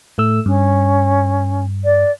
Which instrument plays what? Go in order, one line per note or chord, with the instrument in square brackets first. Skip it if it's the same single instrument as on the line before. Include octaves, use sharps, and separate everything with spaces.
[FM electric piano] A2 A3 E6
[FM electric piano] G2 [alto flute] C#4
[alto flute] D5